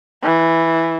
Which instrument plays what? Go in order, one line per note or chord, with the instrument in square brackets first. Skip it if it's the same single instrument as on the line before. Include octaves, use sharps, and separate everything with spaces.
[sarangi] E3